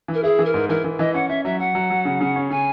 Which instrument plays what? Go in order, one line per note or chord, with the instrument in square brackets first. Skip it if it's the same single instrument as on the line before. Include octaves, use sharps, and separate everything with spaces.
[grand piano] E3
[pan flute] A#4
[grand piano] E4 [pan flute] G#4
[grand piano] E3
[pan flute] A#4
[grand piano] G#2
[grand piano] E3 [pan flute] A#4
[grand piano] E3
[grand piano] E3 [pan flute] D#5
[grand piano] C#4 [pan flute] F#5
[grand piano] C#4 [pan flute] E5
[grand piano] F#3 [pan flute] E5
[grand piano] F#3 [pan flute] F#5
[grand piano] F#3
F#3
C#3
C#3
C#4
[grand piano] C#3 [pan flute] G#5